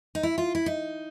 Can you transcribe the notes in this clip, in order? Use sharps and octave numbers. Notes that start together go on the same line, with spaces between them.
D#4
E4
F4
E4
D#4